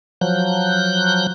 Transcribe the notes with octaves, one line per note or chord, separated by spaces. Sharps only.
F3 F#3 F#6 G6